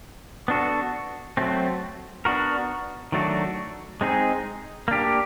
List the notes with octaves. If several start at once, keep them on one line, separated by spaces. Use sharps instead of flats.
B3 D4 F#4 A4
F#3 A3 C4
B3 D4 F#4 A#4
D#3 F#3 A3 D4 F#4
G#3 C4 D#4 G#4
A#3 D4 G4